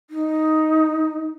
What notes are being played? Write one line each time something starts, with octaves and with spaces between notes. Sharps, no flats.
D#4